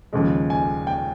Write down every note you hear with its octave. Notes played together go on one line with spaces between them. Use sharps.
D#2 C#3 F3 G#3
G#5
G5